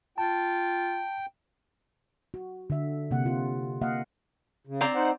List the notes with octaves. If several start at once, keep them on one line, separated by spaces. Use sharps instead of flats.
F4 G5 A5
F#4
D3 E5
C3 A#3 F#5
F4
A#3 D#5 F5 F#5
C#3
C4 D5 A#5
D#4 C5 F#5